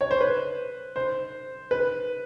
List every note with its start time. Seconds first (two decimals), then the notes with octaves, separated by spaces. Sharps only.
0.01 C#5
0.11 C5
0.21 B4
0.96 C5
1.71 B4